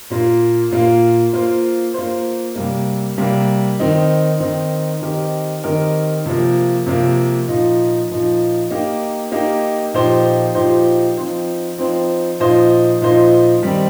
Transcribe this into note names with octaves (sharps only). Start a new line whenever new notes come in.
A#2 A#3 F4
A#2 A#3 F4
A#3 F4 C5
A#3 F4 C5
C3 G3 A#3
C3 G3 A#3
D#3 C4 D#4
D#3 C4 D#4
D#3 C4 G4 A#4 D#5
D#3 C4 G4 A#4 D#5
C3 F3 A#3
C3 F3 A#3
A#2 F3 D#4
A#2 F3 D#4
A#3 D#4 G4
A#3 D#4 G4
A#2 F3 D#4 G4 C5
A#2 F3 D#4 G4 C5
F3 C4 D#4 C5
F3 C4 D#4 C5
A#2 F3 D#4 C5 D#5
A#2 F3 D#4 C5 D#5
D#3 G3 C4 D#4